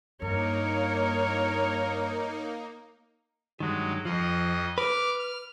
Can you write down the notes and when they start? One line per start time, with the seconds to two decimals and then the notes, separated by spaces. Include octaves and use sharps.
0.22 G2 A#3 D#4 A#4 C#5
3.60 G2 D#3 F#3 G#3
4.05 F2 F3 D#5
4.78 B4 D6 F6
5.19 F6